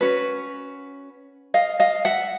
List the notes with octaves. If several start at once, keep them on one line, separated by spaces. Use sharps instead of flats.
C#4 F#4 B4
D#5 F5
D#5 F5
E5 F#5